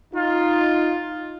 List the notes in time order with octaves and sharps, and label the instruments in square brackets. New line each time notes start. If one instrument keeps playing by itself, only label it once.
[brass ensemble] D#4 F4